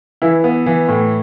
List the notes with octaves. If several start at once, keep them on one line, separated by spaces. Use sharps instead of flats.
E3 E4
B3
E3
A2